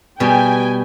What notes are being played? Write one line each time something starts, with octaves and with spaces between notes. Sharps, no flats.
B2 G3 G5 G#5